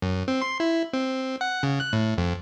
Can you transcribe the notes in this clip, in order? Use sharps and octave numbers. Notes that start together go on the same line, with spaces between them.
F#2
C4
C6
E4
C4
F#5
C#3
F#6
A2
F2